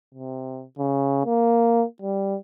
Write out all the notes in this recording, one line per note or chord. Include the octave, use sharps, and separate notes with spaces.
C3
C#3
A#3
G3